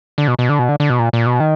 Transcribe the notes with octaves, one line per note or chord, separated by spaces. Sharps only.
D3
B2
B2
D3
B2
D3
D3
B2
A#2
A#2
B2
D#3